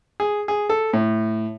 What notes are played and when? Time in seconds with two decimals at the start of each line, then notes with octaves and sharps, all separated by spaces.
0.20 G#4
0.48 G#4
0.69 A4
0.93 A2